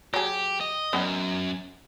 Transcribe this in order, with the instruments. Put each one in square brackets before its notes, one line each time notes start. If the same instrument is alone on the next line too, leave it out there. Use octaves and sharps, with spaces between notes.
[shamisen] F#3 G#4 [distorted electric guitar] G4
[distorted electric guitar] D#5
[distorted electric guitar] F#2 [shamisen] B3 C#4 D#4